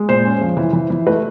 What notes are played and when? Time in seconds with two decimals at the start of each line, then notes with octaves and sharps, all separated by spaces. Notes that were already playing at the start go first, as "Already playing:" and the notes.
Already playing: G#3
0.09 A#2 C5
0.25 C#4
0.41 F3
0.57 E3
0.73 E3
0.90 E3
1.06 A3 B4